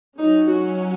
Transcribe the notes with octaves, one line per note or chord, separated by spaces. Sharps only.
F#3 C#4 D#4
F#4